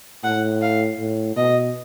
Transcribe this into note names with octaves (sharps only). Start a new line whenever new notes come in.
A2 F#5
F5
A2
B2 D#5